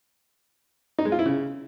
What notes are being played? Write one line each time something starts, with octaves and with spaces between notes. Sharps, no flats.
D#4
G#3
F4
E4
C#3